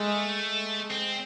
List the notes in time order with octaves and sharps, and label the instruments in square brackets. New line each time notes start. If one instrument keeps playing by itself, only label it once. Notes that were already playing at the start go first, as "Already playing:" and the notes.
Already playing: [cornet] G#3 [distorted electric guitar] A3
[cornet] G#3
[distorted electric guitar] C4